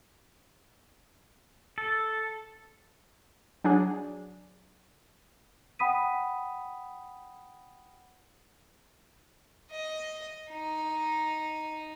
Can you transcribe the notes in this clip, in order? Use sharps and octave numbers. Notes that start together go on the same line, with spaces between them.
A4
F#3 D4 G#4
F#5 G5 B5 D#6 B6 D#7
D#5
D#4